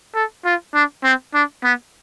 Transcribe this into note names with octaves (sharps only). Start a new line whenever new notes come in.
A4
F4
D4
C4
D4
B3